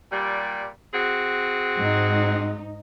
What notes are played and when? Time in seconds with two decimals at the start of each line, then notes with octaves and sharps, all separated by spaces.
0.10 A#2 G3
0.94 C4 F#4 G#4
1.77 G#2 D#4